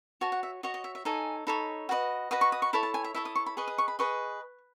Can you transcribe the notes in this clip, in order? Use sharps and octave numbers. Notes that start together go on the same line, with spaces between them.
F#4 C#5 A5
F#5
E5
F#4 C#5 D#5
D#5
E5
E5
D#4 A4 C#5 G#5
D#4 A4 C#5 B5
F#4 B4 D#5
F#4 B4 D#5 D#6
C#6
D#6
C#6
E4 A4 C#5 B5
A5
G#5
E5
E4 A4 C#5 E5
D#6
C#6
B5
G#4 B4 D#5 C#6
D#6
C#6
B5
G#4 B4 D#5 C#6